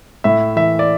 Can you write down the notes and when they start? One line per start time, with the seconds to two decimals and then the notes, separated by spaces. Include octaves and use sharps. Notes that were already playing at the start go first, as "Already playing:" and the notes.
0.24 A2 E5
0.56 E3 E5
0.79 D5